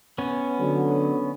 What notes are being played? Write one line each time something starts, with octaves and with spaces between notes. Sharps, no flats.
B3 C#4
D3 F#3